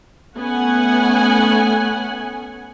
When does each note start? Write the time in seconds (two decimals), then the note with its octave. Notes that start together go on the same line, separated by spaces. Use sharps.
0.37 A3 B3 C#4 F#5 G#5